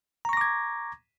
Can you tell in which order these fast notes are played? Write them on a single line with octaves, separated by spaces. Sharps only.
A#5 C#6 A#6 D6 G#6